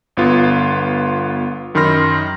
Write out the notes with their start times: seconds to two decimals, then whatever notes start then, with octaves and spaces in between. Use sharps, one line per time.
0.17 G1 B3 F4
1.74 F#2 D#3 B5 C6 F6 A#6